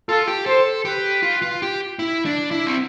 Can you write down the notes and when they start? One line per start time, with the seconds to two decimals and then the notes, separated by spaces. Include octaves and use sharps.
0.08 F4 A4
0.28 G4
0.46 A4 C5
0.85 G4 B4
1.23 F4
1.42 F4
1.62 G4
1.99 E4
2.25 D4
2.51 E4
2.66 C4